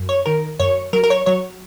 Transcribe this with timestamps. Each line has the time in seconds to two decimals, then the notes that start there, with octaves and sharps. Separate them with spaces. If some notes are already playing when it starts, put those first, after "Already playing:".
Already playing: F#2
0.09 C#5
0.26 D#3 A#4
0.60 F#2 C#5
0.93 F#3 A#4
1.04 A#4
1.10 C#5
1.26 F#3 C#5